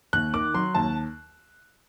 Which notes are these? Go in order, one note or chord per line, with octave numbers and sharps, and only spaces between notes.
D#2 F#6
D#3 D6
F#3 C6
D#2 A5